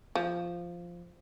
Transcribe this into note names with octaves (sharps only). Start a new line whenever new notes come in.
F3